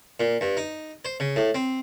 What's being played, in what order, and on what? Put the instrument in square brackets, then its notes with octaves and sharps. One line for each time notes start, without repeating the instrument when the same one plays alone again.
[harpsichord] A#2
G2
D#4
C5
C#3
A2
C4